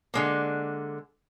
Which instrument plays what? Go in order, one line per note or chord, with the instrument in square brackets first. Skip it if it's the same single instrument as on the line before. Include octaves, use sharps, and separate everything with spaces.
[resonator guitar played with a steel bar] D3 G#3 A#3